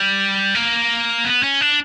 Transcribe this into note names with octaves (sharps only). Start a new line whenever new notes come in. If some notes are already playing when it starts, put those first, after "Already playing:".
Already playing: G3
A#3
B3
C#4
D4